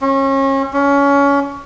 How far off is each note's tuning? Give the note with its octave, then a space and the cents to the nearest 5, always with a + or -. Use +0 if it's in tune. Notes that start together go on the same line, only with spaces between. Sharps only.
C#4 -30
C#4 +25